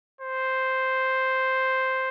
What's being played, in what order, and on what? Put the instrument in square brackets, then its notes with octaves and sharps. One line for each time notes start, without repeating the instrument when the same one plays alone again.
[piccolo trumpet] C5